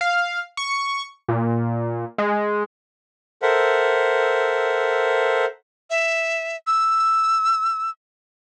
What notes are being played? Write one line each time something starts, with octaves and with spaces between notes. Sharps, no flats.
F5
C#6
A#2
G#3
A4 A#4 C5 E5 F#5
E5
E6